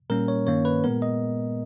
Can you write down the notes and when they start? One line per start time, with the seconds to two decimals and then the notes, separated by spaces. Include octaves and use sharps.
0.10 A#2 G3 A#3 C#4 A#4
0.28 C#5
0.46 G2 D#3 A#3 C#4 C#5
0.65 B4
0.84 A#2 G#3 B3 A#4
1.02 D#5